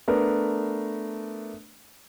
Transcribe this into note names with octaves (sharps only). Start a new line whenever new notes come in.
A3 B3 D4 A#4